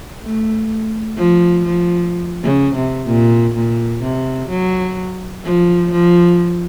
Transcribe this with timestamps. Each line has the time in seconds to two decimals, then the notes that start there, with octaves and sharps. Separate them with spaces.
0.22 A3
1.17 F3
1.65 F3
2.44 C#3
2.75 C3
3.07 A#2
3.55 A#2
4.03 C3
4.49 F#3
5.44 F3
5.91 F3